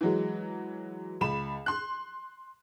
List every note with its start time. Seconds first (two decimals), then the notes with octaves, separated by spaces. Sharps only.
0.01 E3 F#3 G#3
1.21 C#2 B5 E7
1.66 C6 F#6